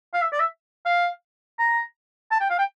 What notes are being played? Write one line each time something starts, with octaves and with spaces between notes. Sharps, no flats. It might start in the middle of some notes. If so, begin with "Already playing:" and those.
F5
E5
D5
E5
F5
A#5
A5
G5
F5
G5